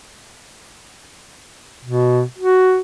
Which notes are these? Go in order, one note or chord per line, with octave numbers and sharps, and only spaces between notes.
B2
F#4